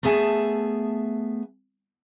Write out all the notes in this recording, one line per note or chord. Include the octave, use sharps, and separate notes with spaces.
A3 B3 G#4 E5 G#5 A5